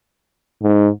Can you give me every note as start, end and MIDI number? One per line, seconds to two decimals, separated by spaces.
0.62 0.88 44